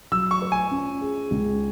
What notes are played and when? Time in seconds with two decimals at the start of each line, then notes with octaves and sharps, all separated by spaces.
0.12 F#3 E6
0.31 C#6
0.42 B4
0.52 G#5
0.71 C#4
1.01 G#4
1.31 C#2